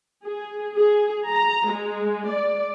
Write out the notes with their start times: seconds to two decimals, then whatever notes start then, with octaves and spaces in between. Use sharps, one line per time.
0.24 G#4
0.75 G#4
1.28 A#5
1.70 G#3
2.29 D5